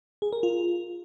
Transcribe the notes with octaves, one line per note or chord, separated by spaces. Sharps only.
G#4
A#4
F4